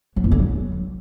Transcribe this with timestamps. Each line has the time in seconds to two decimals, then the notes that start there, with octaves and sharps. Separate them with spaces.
0.16 F#3
0.24 E2
0.31 D3
0.39 F#3